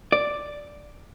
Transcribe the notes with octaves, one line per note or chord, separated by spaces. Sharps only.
D5